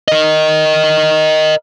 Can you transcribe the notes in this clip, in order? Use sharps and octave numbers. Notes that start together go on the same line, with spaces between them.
A#4 D#5